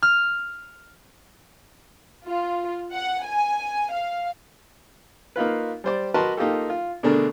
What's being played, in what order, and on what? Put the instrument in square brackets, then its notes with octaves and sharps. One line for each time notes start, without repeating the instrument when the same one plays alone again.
[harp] F6
[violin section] F4
F#5
G#5
F5
[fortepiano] A#3 D#4 F4 B4
G3 C5 D5
F#4 A#4 B4 D#5 A5 C6
A#3 D#4 F4 G4 A4
F4
B2 D3 A3 D4 G#4 A#4